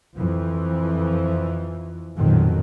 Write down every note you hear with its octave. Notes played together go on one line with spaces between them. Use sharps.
F2 E3 F3
A1 F2 A#2 D#3 F#3